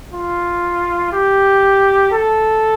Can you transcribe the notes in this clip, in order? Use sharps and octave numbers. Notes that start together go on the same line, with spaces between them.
F4
G4
A4